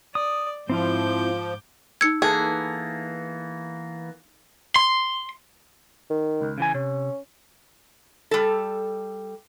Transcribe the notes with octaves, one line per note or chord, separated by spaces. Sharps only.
D5 D#6
G#2 F3 C4 E4 F4 D6 G6
D#4 E6 G#6 C#7
E3 A#3 B3 G#4 A4 E5 A5
C6
D#3
C#2
C#3 E3 G#5
C3 C#4
G3 A4